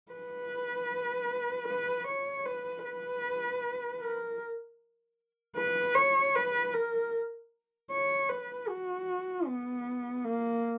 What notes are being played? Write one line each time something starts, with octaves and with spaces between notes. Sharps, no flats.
B4
B4
C#5
B4
B4
A#4
B4
C#5
B4
A#4
C#5
B4
F#4
B3
A#3